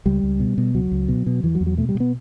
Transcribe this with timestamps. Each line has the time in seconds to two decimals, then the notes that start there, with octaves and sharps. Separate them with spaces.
0.06 C#2 G3
0.23 C#2
0.40 B2
0.58 B2
0.74 C#2 F#3
0.91 C#2
1.09 B2
1.26 B2
1.43 E2 E3
1.55 F#3
1.61 E2
1.66 F#3
1.77 B2 A3
1.89 G3
1.95 B2
2.00 B3